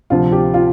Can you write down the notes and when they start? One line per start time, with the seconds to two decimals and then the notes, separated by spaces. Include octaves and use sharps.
0.10 D2 C3 F3 C4 F4
0.32 G4
0.54 F4